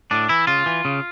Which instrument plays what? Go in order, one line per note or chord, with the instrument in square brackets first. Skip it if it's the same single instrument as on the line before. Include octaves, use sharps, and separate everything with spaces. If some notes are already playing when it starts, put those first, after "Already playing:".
[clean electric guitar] A2 D4
E3 E4
C#3 F4
E3
C#3